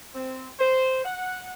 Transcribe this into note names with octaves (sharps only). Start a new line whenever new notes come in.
C4
C5
F#5